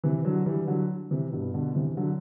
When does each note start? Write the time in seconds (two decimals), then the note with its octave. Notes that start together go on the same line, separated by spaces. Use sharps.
0.04 C3 E3
0.25 D3 F#3
0.46 E3 G3
0.67 D3 F#3
1.11 C3 E3
1.32 G2 B2
1.54 B2 D3
1.75 C3 E3
1.97 D3 F#3